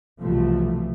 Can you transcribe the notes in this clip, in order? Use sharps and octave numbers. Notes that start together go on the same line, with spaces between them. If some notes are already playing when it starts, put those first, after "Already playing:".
C2 B2 E3 F3 A3